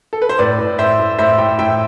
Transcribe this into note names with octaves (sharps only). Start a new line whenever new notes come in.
A4
B4
C5
A2 B4 D5
A2
A2 C5 E5
A2
A2 C5 E5
A2 E5 G5
A2 E5 G5